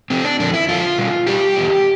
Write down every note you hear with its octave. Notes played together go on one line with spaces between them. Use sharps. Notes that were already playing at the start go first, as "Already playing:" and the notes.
F2 C3 F3 C4
D4
F2 D3 F3 D4
E4
F2 D3 F3 F4
B2 G3
B2 G3 G4
E2 B2 G3